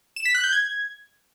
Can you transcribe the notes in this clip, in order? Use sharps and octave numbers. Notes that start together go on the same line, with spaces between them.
E7
B6
F#6
G6
G#6